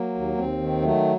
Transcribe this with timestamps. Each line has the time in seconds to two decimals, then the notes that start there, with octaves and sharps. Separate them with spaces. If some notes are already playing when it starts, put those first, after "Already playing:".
Already playing: F#3 A#3
0.15 D#2
0.37 D#2 C4
0.60 D#3
0.82 F#3 A3